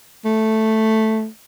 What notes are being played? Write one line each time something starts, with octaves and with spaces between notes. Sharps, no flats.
A3